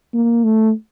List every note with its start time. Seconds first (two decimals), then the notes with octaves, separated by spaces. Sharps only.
0.14 A#3
0.44 A3